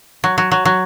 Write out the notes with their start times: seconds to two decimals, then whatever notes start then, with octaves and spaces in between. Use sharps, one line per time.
0.24 F#3
0.38 F#3
0.52 F#3
0.65 F#3